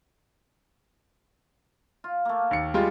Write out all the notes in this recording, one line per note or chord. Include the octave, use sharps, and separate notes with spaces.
F4
A3 A#3
D#2 C#7
G3 G#3 F4